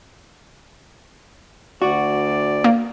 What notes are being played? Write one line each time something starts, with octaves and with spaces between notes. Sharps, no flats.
D2 F#4 D5
A#3